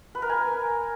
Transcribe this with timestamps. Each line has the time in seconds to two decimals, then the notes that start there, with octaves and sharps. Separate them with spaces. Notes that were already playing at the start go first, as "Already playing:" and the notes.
0.15 B4
0.22 A#4
0.29 G#5